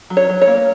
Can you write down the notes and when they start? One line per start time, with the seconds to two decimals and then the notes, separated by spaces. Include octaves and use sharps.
0.10 F#3
0.17 C#5
0.29 F#3
0.41 C#5
0.47 A#3